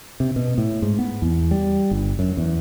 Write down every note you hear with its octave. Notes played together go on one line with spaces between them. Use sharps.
C3
B2
A2
G#2
B3
E2
G3
G1
F#2
E2